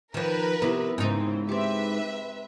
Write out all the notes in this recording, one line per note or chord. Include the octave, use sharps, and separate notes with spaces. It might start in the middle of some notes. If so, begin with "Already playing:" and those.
D#3 F3 A#4 B4
C3 B3 E4
G#2 C#3 C4 D#4
C4 G4 B4 E5